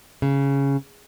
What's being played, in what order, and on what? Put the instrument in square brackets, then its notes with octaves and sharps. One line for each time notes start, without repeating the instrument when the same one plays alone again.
[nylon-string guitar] C#3